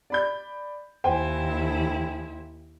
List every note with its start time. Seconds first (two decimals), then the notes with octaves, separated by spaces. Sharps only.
0.10 D5 B5 G6
1.04 D#2 E4 C5 G5 G#5